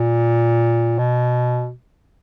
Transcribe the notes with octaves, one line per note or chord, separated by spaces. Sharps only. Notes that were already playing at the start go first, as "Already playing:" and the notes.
Already playing: A#2
B2